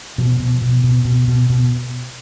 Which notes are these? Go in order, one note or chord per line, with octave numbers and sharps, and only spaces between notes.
B2 F3
B2
B2
B2
B2
B2
B2